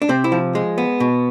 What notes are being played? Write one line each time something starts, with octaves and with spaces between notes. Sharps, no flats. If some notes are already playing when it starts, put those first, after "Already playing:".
D4
C3 C4
E4
F3
G#3
B3
B2